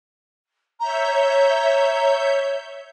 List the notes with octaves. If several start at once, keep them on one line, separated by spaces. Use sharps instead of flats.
C#5 E5 A#5 G6